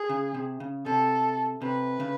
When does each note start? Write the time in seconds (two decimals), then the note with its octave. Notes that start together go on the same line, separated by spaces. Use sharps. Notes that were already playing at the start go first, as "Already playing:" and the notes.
Already playing: G#4
0.09 C#3
0.34 C3
0.60 C#3
0.86 C3 A4
1.62 C3 B4
2.00 C#3